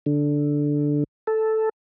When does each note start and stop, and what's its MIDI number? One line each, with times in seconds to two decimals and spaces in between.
0.06 1.04 50
1.27 1.69 69